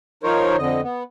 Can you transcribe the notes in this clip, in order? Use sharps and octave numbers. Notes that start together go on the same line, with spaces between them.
F3 D#4 A#4 C5 C#5
F2 D3 D#5
B3